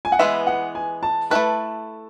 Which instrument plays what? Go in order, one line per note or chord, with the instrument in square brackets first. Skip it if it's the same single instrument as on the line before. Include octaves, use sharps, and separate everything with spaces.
[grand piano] G#5
F#5
[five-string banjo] E3 G#3 B3 [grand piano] E5
[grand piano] F#5
G#5
A5
[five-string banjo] A3 E4 B4 [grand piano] A5